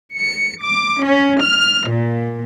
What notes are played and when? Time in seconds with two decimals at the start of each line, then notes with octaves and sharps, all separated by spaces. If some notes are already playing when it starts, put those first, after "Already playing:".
0.16 C#7
0.63 D6
1.03 C#4
1.41 F6
1.89 A#2